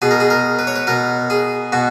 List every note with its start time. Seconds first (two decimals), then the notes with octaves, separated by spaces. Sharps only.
0.02 B2 G#4
0.11 A#4
0.20 G#4
0.30 A#4
0.59 B4
0.67 C#5
0.76 B4
0.87 B2 A#4
1.30 G#4
1.72 B2 F#4